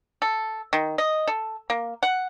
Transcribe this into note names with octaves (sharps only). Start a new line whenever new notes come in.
A4
D#3
D#5
A4
A#3
F#5